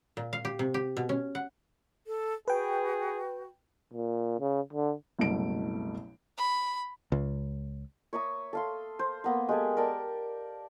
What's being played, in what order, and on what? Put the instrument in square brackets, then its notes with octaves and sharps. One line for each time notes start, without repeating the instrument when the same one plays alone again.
[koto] A#2
F5
G4
C3
G4
B2
C#4
F#5
[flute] A4
[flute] F#4 [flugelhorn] G#4 [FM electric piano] B4 G5
[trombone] A#2
C#3
D3
[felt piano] F#1 C2 B2 A3 D7
[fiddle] B5
[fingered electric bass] C#2
[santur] C#5 E5 A#5 D#6
A4 F5 C6
C5
A#3 B3 A#5
G#3 G4 A4 G#5
A#4 D5 G5 A5